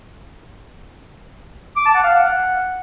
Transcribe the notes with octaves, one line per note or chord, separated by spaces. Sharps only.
D6
A5
F#5
F5
F#5